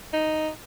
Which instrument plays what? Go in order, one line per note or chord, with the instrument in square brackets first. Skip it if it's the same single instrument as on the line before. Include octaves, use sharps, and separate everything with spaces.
[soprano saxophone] D#4